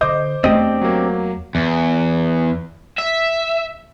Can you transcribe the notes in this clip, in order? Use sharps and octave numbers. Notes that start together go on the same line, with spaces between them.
D3 C5 D#5 D6 G6
E2 A3 C4 D4 G4 D#5
F#3 A#3
E2
E5